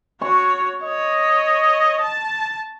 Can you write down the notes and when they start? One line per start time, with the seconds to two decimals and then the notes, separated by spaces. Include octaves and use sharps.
0.21 F#4 C#5 C#6
0.83 C#5 D#5
2.01 A5